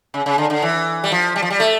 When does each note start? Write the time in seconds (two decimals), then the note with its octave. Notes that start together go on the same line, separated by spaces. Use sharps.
0.14 C#3
0.26 C#3
0.38 D3
0.50 D3
0.62 E3
1.04 G3
1.12 F3
1.36 G3
1.42 F3
1.50 G3
1.60 A3